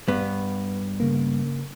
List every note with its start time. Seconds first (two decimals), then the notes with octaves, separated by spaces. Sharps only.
0.08 G2 B3
1.00 C#3 A#3